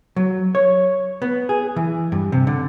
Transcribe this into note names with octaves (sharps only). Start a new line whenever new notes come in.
F#3
C#5
B3
G#4
E3
G2
C3
D3